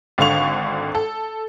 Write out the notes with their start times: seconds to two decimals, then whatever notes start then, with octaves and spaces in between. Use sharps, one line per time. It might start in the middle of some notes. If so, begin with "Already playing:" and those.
0.18 G#1 D3 F5 C#6 F7
0.95 A4